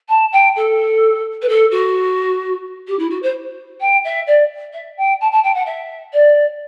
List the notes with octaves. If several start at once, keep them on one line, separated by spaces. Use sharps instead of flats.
A5
G5
A4
B4
A4
F#4
G4
E4
F#4
C5
G5
E5
D5
E5
G5
A5
A5
G5
F#5
E5
D5